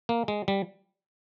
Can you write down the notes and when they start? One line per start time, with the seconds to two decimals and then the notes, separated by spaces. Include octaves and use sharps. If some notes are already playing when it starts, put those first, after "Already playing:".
0.09 A#3
0.28 G#3
0.48 G3